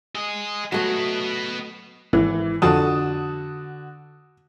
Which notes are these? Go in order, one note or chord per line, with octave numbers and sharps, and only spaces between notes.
G#4 D#5
F#3 A3 B3 F#4 D#5
G#1 E3
F2 D3 F3 F#4 A5 D#6